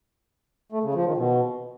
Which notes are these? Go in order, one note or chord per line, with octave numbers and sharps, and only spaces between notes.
A3
C#3
F3
D#3
B2